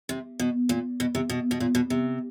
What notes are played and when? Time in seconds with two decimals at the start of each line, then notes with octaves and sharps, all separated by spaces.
0.09 C3
0.40 B2
0.69 A#2
1.00 B2
1.15 C3
1.30 B2
1.51 B2
1.60 A#2
1.75 B2
1.90 C3